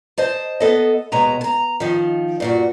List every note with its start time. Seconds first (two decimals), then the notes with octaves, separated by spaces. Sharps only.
0.18 C5 D#5 A5
0.60 B3 A4 D#5
1.12 D#2 B2 G#3 A#5
1.41 A5 A#5
1.80 D#3 F3
2.40 G2 A#2 F#4